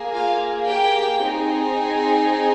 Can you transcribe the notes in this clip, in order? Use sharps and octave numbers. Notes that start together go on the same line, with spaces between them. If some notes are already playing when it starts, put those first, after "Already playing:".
Already playing: A#3 G#4
F4 F5
G4 G5
C4 D#4 G#4